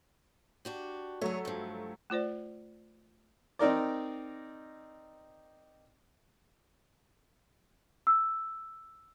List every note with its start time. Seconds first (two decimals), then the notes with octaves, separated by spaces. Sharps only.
0.65 D4 F#4 G4
1.21 F#3 A3 G#4 C#5
1.45 G2 F3
2.10 A3 F4 C5 D5
3.59 C4 D#4 A#4 D5
8.07 E6